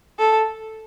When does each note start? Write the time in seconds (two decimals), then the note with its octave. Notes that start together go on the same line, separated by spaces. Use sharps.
0.19 A4